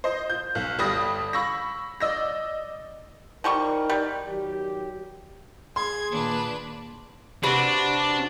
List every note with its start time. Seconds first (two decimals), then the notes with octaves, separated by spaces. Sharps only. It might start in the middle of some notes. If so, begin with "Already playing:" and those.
0.04 C5 D#5
0.30 G6
0.55 B1
0.79 G1 G3 D#6 A#6
1.33 B5 C#6 E6 A#6
2.00 D5 D#5 E6 A#6
3.44 F3 G3 D#4 A#4 C#6
3.89 G3
4.26 D#3 F#3 G4
5.76 G#4 C6 G#6
6.11 A#2 D#3 A#3 D4 B4
7.43 C3 D4 F#4 B4